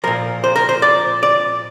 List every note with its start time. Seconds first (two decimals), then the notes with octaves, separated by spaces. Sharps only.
0.04 A#2 F3 A#4
0.44 C5
0.56 A#4
0.69 C5
0.82 D5
1.23 D5